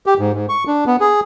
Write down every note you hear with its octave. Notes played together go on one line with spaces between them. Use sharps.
G4
G#2
G#2
C#6
D4
B3
G#4